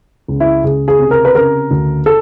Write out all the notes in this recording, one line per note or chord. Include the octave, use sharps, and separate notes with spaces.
C#2
E4
C#2 G#4
G#4
C3
A#4
B4
C#3 A#4
D2
A4